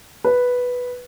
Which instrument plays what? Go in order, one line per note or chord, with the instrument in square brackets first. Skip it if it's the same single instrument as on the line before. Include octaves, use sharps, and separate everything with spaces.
[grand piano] B4